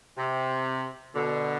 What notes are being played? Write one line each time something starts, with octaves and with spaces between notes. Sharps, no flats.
C3
B2 D3